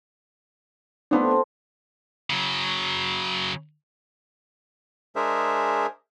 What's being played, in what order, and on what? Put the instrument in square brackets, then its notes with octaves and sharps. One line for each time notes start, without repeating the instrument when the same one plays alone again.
[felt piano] A3 B3 D4 [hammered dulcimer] C4 F4 A4
[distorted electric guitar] C#3 F#3
[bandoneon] G#3 D4 G#4 A#4 C5 E5